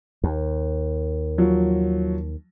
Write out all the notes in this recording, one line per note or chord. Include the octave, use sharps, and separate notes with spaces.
D#2
F3 F#3